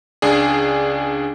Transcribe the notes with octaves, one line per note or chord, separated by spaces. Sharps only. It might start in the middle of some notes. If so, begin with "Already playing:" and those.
C#2 D4 G#4